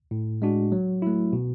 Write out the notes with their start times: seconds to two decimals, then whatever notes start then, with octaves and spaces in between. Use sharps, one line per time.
0.11 A2
0.42 G#3 D4 F#4
0.72 F#3
1.02 A3 E4
1.33 B2